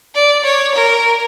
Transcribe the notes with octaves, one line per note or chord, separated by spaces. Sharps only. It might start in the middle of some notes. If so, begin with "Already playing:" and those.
D5
C#5
A#4